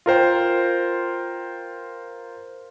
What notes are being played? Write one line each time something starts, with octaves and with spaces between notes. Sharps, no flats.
F4 A#4 C5 G5